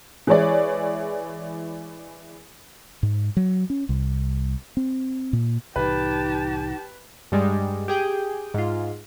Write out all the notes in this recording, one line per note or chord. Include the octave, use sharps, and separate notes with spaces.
E3 G#3 E4 G#4 C#5 D5
G#2
F#3
C#4
C2
C4
A#2
C2 A2 E3 D#4 G4 B4 A5
G2 G3 G#3
G4 G#4 G5
G#2 F4